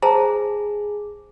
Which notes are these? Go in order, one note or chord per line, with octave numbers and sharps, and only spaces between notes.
G#4 C5 A5 A#5